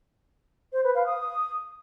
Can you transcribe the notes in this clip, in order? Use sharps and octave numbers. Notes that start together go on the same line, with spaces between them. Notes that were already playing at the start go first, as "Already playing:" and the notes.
C5
B4
F5
D#6